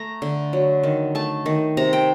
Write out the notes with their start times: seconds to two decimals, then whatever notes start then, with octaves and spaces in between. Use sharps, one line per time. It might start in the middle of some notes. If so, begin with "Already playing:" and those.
Already playing: A3 A#5
0.22 D3
0.53 F#3
0.83 D#3
1.15 A3 A5
1.46 D#3
1.77 C3 A#5
1.93 G5